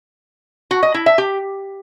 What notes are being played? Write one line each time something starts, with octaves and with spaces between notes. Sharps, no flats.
F#4
D#5
E4
E5
G4